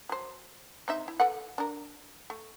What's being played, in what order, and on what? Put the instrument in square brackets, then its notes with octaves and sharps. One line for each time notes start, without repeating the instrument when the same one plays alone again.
[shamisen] F#3 C5
C4 D#4 E5
E4
A4 B4 F#5
D4 A#4
A3